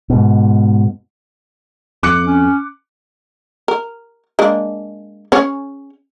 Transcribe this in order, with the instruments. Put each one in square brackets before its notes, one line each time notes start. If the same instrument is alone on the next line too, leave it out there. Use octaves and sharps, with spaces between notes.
[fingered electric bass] G#2 B2
[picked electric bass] F2 [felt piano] D6 F#6 C#7
[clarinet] C#4
[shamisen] A#4
G#3 A#3 D4
C#4 G#4 C#5